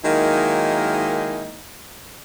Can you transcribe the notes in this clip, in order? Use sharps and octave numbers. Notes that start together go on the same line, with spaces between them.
D#3 F#3 G#3 A#3 D#4 E4